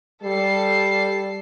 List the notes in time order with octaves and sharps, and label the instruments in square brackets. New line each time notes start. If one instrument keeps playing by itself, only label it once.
[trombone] G3 [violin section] A4 C7